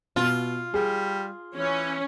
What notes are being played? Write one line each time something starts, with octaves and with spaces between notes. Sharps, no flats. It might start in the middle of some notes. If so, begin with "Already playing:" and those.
B2 F4
G3 G#4
E3 C#4